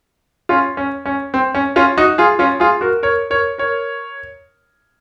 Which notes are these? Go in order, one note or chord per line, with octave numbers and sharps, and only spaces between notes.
C#4 F4
C#4
C#4
C4
C#4
C#4 F4
D#4 F#4
F4 G#4
C#4 F4
F4 G#4
F#4 A#4
A#4 C#5
A#4 C#5
A#4 C#5